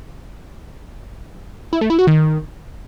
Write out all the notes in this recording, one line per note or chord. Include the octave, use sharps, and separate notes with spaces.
E4
A3
E4
F#4
D#3